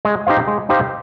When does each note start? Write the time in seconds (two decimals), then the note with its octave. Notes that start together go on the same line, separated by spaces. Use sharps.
0.05 G#3
0.27 D#4 G4 C5 F5
0.48 G#3
0.69 D#4 G4 C5 F5